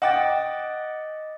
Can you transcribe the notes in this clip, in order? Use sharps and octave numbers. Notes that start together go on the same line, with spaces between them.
D#5 F#5 G5 D6 A6